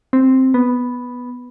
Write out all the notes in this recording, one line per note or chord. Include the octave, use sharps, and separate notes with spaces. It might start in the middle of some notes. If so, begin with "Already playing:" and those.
C4
B3